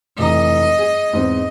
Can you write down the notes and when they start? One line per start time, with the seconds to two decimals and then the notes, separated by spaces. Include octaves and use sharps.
0.18 F1 E3 D#5 A#5
0.78 G#4
1.13 E2 G#2 C4